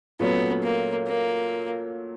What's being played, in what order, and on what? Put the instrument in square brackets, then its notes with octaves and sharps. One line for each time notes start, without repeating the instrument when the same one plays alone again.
[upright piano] A#2 F#3 A3 C#4 [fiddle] B3
[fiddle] A#3
A#3